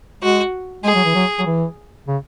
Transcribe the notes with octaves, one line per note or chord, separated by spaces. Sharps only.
G#3 F#4
G#3 G#4
F#3
E3
F#3
F#3
E3
C#3